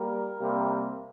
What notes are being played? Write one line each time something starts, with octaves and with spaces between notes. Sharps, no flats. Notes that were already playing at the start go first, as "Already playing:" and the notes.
Already playing: G3 A#3 A#4
C3 G3 A#3